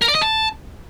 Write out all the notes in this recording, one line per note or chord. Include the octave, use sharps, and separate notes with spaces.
A#4
D5
D#5
A5